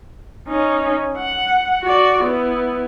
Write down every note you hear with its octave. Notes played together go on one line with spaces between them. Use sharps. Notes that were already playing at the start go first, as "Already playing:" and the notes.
C#4 D#4
F#5
F#4 D5
B3 E4